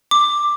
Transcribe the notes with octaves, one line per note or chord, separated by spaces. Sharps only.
D6